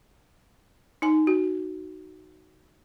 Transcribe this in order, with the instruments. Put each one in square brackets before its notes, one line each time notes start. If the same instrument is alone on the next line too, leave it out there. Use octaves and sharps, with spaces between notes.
[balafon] D#4 G#5
F#4